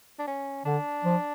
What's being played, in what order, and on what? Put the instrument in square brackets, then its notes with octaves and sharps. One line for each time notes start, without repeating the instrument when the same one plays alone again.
[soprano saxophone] D4
C#4
[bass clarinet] D3 [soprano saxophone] D4
[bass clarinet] F3